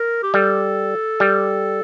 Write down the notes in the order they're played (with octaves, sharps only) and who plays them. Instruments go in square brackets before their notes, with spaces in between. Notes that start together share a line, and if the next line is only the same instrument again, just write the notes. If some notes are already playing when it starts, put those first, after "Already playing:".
Already playing: [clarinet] A#4
G4
[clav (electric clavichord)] G3 [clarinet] A4
[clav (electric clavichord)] G3